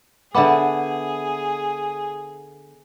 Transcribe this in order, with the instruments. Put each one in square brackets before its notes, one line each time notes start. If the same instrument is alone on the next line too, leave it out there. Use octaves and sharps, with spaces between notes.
[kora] D3 B3 [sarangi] G#4 [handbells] E5 B5 D6